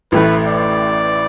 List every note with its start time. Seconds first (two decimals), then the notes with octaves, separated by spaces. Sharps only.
0.12 A1 A2 E3 A3 B4
0.47 D5